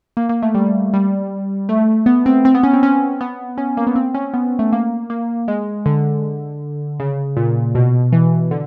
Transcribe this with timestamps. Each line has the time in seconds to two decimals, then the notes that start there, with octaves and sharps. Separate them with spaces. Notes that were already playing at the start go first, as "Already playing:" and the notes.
0.17 A#3
0.29 A#3
0.43 A3
0.55 G3
0.93 G3
1.69 A3
2.06 B3
2.26 C4
2.45 C4
2.55 B3
2.63 C#4
2.73 C4
2.83 C#4
3.21 B3
3.58 C#4
3.77 A#3
3.87 B3
3.95 C4
4.14 C#4
4.34 B3
4.59 A3
4.72 A#3
5.10 A#3
5.48 G#3
5.86 D3
7.00 C#3
7.37 A#2
7.75 B2
8.12 E3
8.51 D3